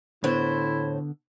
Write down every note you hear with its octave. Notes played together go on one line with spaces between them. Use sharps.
A2 D3 B3 E4 C5